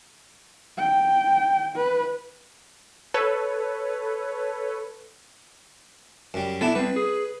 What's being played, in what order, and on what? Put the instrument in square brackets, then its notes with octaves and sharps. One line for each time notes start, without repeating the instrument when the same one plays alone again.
[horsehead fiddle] G5
B4
[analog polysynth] A4 B4 C#5
[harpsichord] F#2 G3
[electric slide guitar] C3 B3 [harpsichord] D4 E4 A4
[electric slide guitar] G3 C4 [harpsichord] B4
[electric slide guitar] G#4